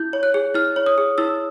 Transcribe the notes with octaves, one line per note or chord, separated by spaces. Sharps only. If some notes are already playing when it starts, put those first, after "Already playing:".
Already playing: E4 G6
C#5
F#6
G#4
E4 F6
C#5
D#6
G#4
E4 E6